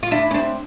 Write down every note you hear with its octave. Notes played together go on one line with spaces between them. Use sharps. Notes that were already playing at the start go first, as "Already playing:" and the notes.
F4
D4 E4
C#4
C4 D4